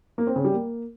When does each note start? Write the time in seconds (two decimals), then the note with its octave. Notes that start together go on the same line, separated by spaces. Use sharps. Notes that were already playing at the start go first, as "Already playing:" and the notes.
0.18 A#3
0.27 C4
0.36 C#3
0.45 G3
0.53 A#3